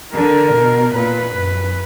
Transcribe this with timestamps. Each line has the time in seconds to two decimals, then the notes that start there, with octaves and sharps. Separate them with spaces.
0.13 D3 A#4
0.54 B2
0.95 A#2 B4
1.36 F#2